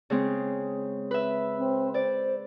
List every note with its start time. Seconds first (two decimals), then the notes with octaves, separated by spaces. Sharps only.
0.10 C#3 G#3 C4
1.11 B4 E5
1.58 C4
1.94 C5 D5